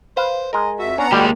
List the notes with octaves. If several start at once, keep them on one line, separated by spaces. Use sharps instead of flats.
B4 C5 F5
G#3 A#4 D#5
F2 F#4 E5
B3 C#4 D4 F#5 A#5
G3 G#3 A#3 F#4 G4